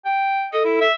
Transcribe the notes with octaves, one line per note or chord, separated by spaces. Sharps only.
G5
A4 D#5
E4
E5